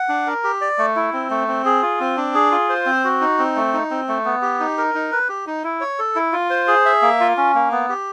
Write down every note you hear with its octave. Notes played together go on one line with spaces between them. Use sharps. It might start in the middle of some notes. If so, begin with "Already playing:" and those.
Already playing: F#5
D4
A#4
G4
D5
A3
E4
C4
A3
C4
G#4
F4
C4
D4
G#4
F4
C5
C4
F#4
D#4
C4
A3
D#4
C4
A3
B3
G4
D#4
A#4
D#4
B4
G4
D#4
E4
C#5
A4
E4
F4
C5
G#4
E5
A#3
F4
C#4
A#3
B3
G4